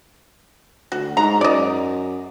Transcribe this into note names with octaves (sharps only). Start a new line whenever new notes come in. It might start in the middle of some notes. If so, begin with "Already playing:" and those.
D2 F#4
G#2 A#5
F#2 D5 D#5